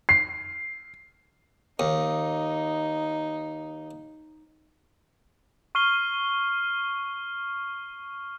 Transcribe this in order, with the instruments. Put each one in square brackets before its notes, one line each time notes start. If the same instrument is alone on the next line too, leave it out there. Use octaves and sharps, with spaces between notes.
[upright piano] C7
[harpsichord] D#2 [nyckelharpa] D#4
[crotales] C#6 F6 C7 D#7 G7